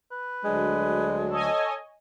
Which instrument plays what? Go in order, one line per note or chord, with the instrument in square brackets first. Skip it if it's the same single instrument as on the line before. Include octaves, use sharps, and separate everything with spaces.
[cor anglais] B4
[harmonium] D2 F#3 D4 [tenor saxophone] G#3
[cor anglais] A4 [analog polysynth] C#5 D#5 G#5